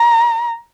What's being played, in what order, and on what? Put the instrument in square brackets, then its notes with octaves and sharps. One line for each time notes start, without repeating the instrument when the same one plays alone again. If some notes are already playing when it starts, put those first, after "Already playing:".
Already playing: [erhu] A#5